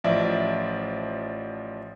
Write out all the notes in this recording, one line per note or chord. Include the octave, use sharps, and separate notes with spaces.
A1 F3 D5 E5